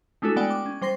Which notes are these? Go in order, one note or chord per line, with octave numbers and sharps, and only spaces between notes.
G#3 A3 D4 E4 F#4 A4
G#3 B3 D5 F#5 G5
D6
C#4
G3 C5 C6 A#6 C7